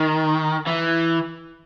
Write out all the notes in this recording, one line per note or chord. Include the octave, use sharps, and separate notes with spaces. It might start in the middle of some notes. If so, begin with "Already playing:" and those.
Already playing: D#3
E3